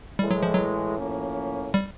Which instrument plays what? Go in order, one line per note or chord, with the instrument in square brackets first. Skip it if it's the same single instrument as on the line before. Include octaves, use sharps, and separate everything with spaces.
[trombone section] A2 E3 G#3 [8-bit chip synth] G3
[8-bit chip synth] F#3
F3
F#3
[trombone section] A2 F3 A#3 C#4
[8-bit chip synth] G3